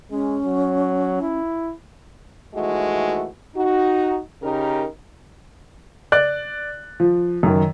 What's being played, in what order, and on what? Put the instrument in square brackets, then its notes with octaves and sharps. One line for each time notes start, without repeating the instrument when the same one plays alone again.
[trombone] G#3 [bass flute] C#4
[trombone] F#3
E4
[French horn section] D#2 E3 G#3 A3 F#4
D#4 F#4
C#3 D#4 G4 A#4
[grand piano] D5 F#6
F3
F#2 D#3